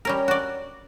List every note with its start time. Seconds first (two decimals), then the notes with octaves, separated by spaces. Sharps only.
0.05 G3 C#4 A#4
0.28 F#4 D5